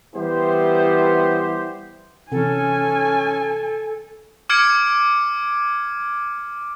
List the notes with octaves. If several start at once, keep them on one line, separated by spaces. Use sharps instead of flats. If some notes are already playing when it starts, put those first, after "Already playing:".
E3 G3 B3 E4 G4 C5
C3 E3 C#4 A4 G#5
D6 F6 G#6 C#7 D7